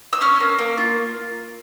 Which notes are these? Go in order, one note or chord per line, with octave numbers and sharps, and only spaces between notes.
E6
C#4 F6
A#3
A#3
F4